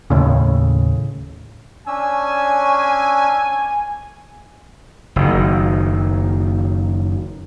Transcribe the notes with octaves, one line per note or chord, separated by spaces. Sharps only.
D#2 A2 C#3
C#4 D4 G#5 E6
F#1 D#3